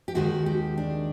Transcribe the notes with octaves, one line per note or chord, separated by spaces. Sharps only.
G4
D#2 D#3 G#3 F#4
G4
D4